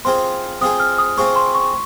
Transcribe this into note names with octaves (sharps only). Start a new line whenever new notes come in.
C4 F4 G#4 C5 C6
C4 F4 G#4 C5 D#6
F6
D#6
C4 F4 G#4 C5 C#6
C6
C#6